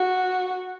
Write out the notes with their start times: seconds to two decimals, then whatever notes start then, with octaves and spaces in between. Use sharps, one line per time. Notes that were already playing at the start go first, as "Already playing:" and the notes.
Already playing: F#4